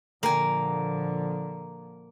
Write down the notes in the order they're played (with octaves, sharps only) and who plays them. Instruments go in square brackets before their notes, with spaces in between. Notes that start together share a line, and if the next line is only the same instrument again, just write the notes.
[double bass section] A#2 D3 F3 [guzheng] A#3 G#5